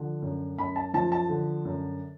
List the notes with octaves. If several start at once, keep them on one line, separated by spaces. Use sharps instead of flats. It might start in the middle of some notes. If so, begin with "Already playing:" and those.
Already playing: D3 F3
F#2
F#2 B5
A5
F3 A5
A5
D3
F#2